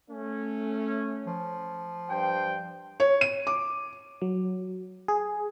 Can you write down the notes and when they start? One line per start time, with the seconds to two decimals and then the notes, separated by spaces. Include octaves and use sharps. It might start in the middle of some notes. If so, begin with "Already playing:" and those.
0.10 A3 C#4
1.27 F3
2.10 G2 C5 G5
3.00 C#5
3.21 D#7
3.47 D6
4.22 F#3
5.08 G#4